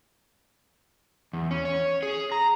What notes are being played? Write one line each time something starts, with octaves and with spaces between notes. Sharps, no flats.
E2
C#4
C#5
G#4
A#5